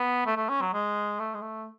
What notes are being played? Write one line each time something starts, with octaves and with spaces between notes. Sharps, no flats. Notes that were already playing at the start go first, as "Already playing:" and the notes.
Already playing: B3
A3
A3
C#4
F#3
G#3
A3
G#3
A3